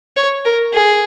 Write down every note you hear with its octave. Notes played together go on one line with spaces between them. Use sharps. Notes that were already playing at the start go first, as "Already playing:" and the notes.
C#5
A#4
G#4